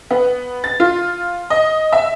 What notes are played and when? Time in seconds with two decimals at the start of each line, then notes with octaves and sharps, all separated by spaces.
0.11 B3
0.64 A6
0.80 F4
1.50 D#5
1.92 E5